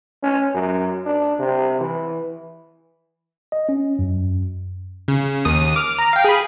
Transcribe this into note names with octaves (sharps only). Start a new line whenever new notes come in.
C#4
F#2
D4
C3
E3
D#5
C#4
F#2
C#3
D#2 D#6
D6 F6
A#5
F5 G5
G#4 B5